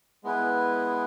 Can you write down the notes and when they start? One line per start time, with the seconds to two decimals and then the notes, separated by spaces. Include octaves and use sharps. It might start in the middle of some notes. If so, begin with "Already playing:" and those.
0.24 G#3 B3 E4 G#4 B4